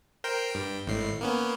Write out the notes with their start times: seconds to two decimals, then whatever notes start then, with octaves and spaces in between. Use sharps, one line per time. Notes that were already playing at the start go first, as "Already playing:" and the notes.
0.24 A#4 C5 G5
0.51 G2 G5
0.87 G#1 A2 C7
1.21 A#3 B3 C#4